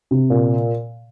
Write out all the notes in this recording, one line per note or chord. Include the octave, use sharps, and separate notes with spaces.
C3
A#2